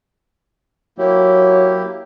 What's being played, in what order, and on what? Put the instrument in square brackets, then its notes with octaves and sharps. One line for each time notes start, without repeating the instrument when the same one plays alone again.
[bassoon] F#3 [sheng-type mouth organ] A#3 E4 G4